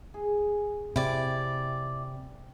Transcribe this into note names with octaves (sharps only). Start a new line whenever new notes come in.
G#4
C3 E4 D5 G5